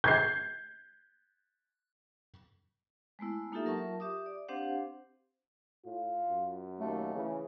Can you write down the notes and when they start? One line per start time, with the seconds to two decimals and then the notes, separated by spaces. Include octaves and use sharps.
0.04 G6 G#6 C7
3.19 G#3 A3 B3 E4
3.52 A#3 D#4 F4 G4 A4 E5
3.64 F#3 F4 A#4 E5 A5 C#6
4.00 G4 E5 D6 D#6
4.26 D5
4.49 C4 D4 G4 C5 F5 F#5
5.86 A2 F4
6.29 F#2
6.80 D#2 A3
7.15 C#3 E3